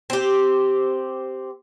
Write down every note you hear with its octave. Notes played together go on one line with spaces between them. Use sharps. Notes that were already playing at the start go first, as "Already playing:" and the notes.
C4 G4